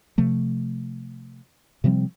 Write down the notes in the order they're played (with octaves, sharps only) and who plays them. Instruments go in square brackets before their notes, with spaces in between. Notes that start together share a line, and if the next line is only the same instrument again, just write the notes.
[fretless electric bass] C3 F3 A3
C3 F3 G3 C4